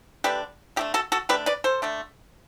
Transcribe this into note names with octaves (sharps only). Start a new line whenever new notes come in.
D3 A3 D4 G4 B4
D3 A3 D4 G4
F#4 A4
F#4 A4
D3 A3 D4 G4 B4
B4 D5
A4 C5
D3 A3 D4